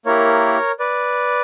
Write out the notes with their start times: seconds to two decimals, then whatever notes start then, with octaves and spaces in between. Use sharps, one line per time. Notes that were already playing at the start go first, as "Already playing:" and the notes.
0.06 A#3 E4 G4 A#4 C#5
0.79 B4 D5